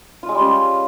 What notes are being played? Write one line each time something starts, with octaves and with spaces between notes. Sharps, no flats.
F4
G#3
G3
C#4